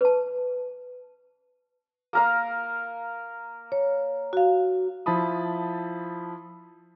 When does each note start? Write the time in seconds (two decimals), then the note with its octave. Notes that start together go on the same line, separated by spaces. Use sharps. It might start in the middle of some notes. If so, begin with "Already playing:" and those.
0.01 B4 A5
2.13 A#3 A#4 F5
3.72 C#5
4.33 F#4 F5
5.06 F3 E4 A5 B5 D#6